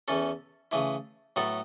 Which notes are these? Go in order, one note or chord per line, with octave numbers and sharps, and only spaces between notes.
E2 E3 C#4 A4
C#3 E3 A3 E4
A2 F#3 B3 A4